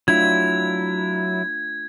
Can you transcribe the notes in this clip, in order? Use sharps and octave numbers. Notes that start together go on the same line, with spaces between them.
F#3 A3 D4 E4 F4 G#6